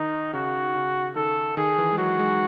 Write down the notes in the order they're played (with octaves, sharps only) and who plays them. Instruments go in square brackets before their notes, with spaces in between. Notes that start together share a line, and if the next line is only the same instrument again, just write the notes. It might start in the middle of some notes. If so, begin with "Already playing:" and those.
Already playing: [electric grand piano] D#3 [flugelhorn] D#4
[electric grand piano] C#3 [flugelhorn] F#4
[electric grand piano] C#3
[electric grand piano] D#3 [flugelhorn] A4
[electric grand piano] D#3 [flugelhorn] G#4
[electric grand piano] E3
G#3
[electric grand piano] F#3 [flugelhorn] F#4
[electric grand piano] G#3